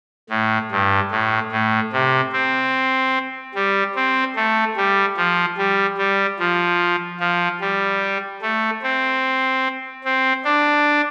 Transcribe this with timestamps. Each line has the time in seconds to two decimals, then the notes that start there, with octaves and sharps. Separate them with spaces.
0.30 A2
0.71 G2
1.11 A2
1.52 A2
1.92 C3
2.33 C4
3.55 G3
3.95 C4
4.36 A3
4.77 G3
5.17 F3
5.57 G3
5.98 G3
6.39 F3
7.20 F3
7.61 G3
8.42 A3
8.82 C4
10.04 C4
10.45 D4